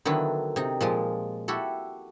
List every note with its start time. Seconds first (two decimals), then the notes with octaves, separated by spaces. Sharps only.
0.05 D3 D#3 F#3 B3 E4
0.56 C3 D#4
0.81 A#2 F3 G#3
1.48 E4 F#4 G4 A4